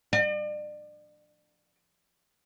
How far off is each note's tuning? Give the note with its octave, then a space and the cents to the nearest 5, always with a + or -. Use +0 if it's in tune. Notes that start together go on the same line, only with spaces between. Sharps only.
D5 +40